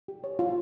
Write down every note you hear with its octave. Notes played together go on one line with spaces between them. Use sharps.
G4
C#5
F4